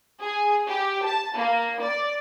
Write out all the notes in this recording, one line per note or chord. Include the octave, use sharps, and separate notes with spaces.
G#4
G4
A5
A#3
D5